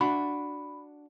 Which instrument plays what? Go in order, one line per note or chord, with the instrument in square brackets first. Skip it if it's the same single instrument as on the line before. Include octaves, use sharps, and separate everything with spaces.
[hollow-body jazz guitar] D4 F#4 [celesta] B5